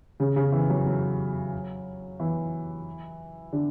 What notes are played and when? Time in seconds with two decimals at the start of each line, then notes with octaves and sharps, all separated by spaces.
0.20 C#3
0.36 C#3
0.52 E3
0.70 F#3
0.86 F#3
2.20 E3
3.53 D3